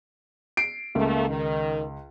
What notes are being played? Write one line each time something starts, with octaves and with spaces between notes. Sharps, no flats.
C7 D7
C#2 A3 A#3
D#3